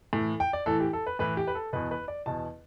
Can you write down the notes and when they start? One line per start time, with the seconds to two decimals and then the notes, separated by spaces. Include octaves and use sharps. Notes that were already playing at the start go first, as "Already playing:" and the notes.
0.13 A2 E3
0.40 G5
0.53 D5
0.66 A2 E3 A4
0.80 G4
0.93 A4
1.07 B4
1.19 A2 E3 B4
1.37 G4
1.48 B4
1.55 A4
1.73 E2 B2 B4
1.91 B4
2.08 D5
2.26 E2 B2 A5